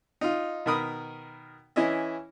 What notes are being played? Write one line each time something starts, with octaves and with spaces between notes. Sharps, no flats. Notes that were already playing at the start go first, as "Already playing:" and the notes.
D#4 F4
B2 D#3 A#4 B5 D#6
E3 C#4 E4 D#5 E5